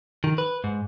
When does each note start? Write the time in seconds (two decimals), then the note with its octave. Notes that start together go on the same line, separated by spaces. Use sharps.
0.24 D#3
0.38 B4
0.64 G#2